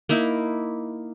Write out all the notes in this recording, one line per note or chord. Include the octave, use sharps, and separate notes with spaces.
A#3 D#4 E4